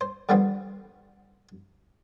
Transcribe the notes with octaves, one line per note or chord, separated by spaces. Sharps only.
C5
D3 D#3 F3 G3 B3 C4